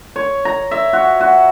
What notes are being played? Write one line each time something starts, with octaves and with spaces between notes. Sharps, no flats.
C#5
A#5
E5
F#4
F#4